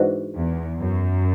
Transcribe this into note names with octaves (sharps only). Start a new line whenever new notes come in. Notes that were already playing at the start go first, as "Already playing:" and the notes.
Already playing: G#2 E3 G#3 D4 F#4
E2
F#2